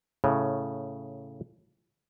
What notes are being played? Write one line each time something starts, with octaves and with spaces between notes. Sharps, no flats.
A2 C#3